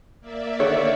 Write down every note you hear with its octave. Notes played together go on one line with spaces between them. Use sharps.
A#3 D5 E5
D3 D#3 C#5